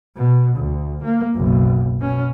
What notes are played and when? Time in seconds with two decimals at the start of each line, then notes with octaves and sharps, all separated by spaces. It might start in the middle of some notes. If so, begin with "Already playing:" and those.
0.16 B2
0.56 D2
1.03 A#3
1.36 F#1 B1
1.99 B2 C#4